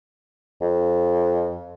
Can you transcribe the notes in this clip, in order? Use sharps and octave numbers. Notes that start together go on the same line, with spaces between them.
F2